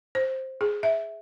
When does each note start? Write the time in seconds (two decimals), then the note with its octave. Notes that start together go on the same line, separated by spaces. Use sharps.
0.15 C5
0.61 G#4
0.83 E5